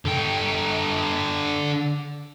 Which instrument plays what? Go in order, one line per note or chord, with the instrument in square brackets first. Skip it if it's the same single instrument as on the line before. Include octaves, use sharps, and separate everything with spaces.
[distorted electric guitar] D3 G5